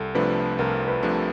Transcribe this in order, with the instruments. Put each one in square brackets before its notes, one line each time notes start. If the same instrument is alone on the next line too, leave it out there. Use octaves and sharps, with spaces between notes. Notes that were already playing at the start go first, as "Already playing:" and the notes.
Already playing: [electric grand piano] C2 [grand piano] A4
[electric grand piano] C3 F3 A3 D4 [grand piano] B4
[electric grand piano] C2 [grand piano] A#4
[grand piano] B4
[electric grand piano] C3 F3 A3 D4